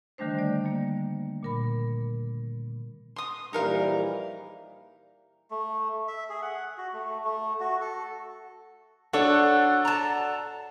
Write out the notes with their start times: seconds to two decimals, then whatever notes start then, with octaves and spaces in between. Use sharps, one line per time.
0.18 D3 D#3 G3 A3 D4 C5
0.39 D5
0.65 G3 A#3
1.43 A#2 A#4 B5
3.16 C6 D#6
3.53 A#1 E3 G3 D#4 A#4 F5
5.51 A3
6.08 E5
6.30 G#4
6.42 F#5
6.78 F#4
6.93 A3
7.24 A3
7.60 F#4
7.81 A4
9.13 D4 F#4 A4 C#5 F#5
9.85 A5 A#5